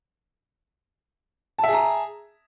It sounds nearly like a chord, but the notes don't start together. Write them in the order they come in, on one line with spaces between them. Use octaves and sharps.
A5 E5 G#4 A#5